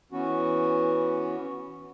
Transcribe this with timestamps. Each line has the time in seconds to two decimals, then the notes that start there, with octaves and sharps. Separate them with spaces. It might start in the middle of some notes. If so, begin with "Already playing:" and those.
0.12 E3 B3 C#4 F#4